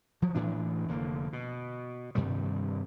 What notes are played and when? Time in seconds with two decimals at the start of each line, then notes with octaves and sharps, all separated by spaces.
0.22 F3 F#3
0.35 A2 E3 D4
0.88 F1 D3 A#3
1.33 B2
2.15 G2 C3 D#3 G3